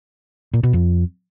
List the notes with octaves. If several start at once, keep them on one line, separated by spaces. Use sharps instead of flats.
A#2
B2
F2